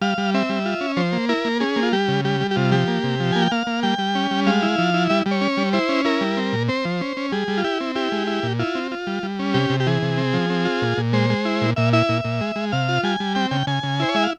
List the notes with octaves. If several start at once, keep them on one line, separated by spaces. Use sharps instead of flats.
G3 F5
G3
C4 E5
G3
F4
C#4
F3 C5
A#3
E4 A#4
A#3
C#4 G#4
A#3
F4
G3 G4
C#3
G3 G4
G3
G4
C3 F4
F3 G4
A#3
C3
F3
A#3 G#5
G5
A#3 F5
A#3
G3 G5
G3
C#4
G3
G#3 F5
E4
F3
E4
G3 E5
G3
C#5
C#4
G3
E4 C5
C#4
E4 A#4
G3
C4
A#2
C4 C5
F3
C#4
C#4
G3 G#4
G3
F4
E4 G4
C4
E4 G4
G#3
E4
A#2
E4 F4
C4
F4
G3
G3
C#4
C3 G4
C3
G4
E3 G#4
C3
C4
F3
C4
F4
A#2
A#2
G#3 C5
G#3
E4
A#2
A#2 E5
E4 E5
A#2
A#2
G#3
G#3
C3 F5
F4
G3 G#5
G3
C4 G5
C#3 G5
C#3 G#5
C#3
E4 C5
C#5
G#3 E5
F5